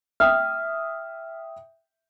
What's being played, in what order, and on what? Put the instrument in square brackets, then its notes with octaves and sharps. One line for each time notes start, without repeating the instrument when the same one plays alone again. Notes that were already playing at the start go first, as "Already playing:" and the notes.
[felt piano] E5 G5 D#6 [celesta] F6